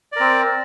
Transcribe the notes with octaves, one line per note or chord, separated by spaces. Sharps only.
C4 A#4 D5